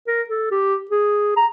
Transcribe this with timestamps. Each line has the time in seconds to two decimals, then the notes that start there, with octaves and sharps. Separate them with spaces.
0.07 A#4
0.29 A4
0.51 G4
0.91 G#4
1.36 A#5